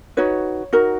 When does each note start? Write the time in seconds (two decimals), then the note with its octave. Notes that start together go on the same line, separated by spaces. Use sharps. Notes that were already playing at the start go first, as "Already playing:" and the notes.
0.17 D#4 F#4 B4 C#5
0.73 D#4 F#4 A#4